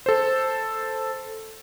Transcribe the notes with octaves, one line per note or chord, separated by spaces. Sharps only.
A4 C5